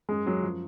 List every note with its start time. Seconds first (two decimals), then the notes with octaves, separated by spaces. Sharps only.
0.09 F#2 G#3
0.26 F#2 F#3
0.43 F3